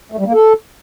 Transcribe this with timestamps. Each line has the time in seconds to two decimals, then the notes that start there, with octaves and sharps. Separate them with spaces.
0.12 A3
0.19 G3
0.26 A#3
0.33 A4